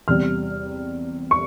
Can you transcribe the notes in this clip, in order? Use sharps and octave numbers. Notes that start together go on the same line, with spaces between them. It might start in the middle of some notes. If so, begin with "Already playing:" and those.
E2 C3 G3 F6
C#6